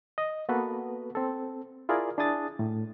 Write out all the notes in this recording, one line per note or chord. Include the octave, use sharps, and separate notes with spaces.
D#5
A#3 B3 F#4 A4 B4
C4 A4
E4 F4 G#4 A#4 D5
D4 E4 G#4 D#6 A6
A2